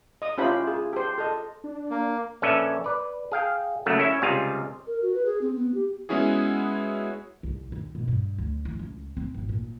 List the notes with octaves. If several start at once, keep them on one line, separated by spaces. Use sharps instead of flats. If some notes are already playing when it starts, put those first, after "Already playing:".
D#5 D#6
C#4 E4 F4 G4 C5 B5
G#4
G4 C5
A4 D#5
D4
A#3
A#1 C#4 A4 B4 D5 E5
B4 D5
G#4 F5 G5
C#3 F#3 A3 A#3
C#4 E4 C#5 E5
C#2 C3 G3 F4 G#4 F5
A#4
F#4
B4
G#4
C4
B3
G4
G#3 B3 C#4 E4 F#4 G#4
C2
D#2
B2
G2
D2
E3
C#2
C4
G#1
A#2